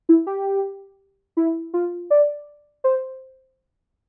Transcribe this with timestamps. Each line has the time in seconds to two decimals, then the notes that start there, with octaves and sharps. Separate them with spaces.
0.09 E4
0.27 G4
1.37 E4
1.74 F4
2.10 D5
2.84 C5